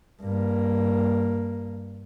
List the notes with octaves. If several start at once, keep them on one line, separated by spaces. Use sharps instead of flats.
G2 A#3